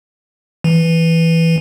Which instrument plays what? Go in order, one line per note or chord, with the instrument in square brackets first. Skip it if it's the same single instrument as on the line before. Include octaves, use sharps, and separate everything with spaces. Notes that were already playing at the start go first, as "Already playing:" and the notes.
[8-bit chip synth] E3